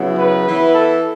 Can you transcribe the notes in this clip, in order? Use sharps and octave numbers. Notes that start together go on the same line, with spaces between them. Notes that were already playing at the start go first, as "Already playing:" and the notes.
Already playing: C#3 F#3 B3 E4
B4
E3 B3 E4
A4